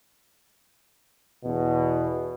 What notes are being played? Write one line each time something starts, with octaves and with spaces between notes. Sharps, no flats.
E2 B2